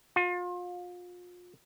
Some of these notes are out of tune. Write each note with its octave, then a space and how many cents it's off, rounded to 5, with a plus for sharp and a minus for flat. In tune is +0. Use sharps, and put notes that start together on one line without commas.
F4 +30